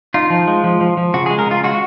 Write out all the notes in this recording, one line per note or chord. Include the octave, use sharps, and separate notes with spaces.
D#4 F4
F3
G#3
F3
F3
F3
C#3 F#4
G#4
G#3
A#4
C#3 F4
G#3 F#4